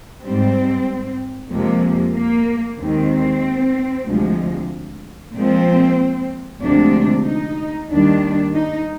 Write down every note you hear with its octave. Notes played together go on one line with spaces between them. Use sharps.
G#2 G3 C4
F2 C3 F3 G#3 A#3
A#3
D#2 D#3 G#3 C4
D2 C3 F3 G#3
A#2 F3 G#3 C4
D2 C3 F3 G#3 D4
D#4
D#2 D#3 G3 D4
D#4